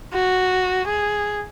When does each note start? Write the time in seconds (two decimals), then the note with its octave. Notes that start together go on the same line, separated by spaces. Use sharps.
0.14 F#4
0.87 G#4